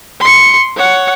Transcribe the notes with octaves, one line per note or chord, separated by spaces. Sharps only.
C6 C#7
C#5 F#5